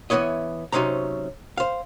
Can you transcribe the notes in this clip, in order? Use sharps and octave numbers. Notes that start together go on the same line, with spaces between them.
E3 B3 E4 C#5 D#5
C3 F#3 C#4 D#4 C5 A#5
C5 F5